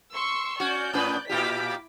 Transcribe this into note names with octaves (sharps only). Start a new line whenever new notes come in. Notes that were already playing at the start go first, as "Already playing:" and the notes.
C6 C#6 E6
C#4 F#4 D5 G6
A2 C#4 B4
A#2 E4 F4 G4 D6 B6